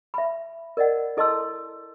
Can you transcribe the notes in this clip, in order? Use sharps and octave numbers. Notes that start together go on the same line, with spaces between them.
E5 B5
A#4 D5 D#5 F#5
E4 A4 D#5 A5 C6 E6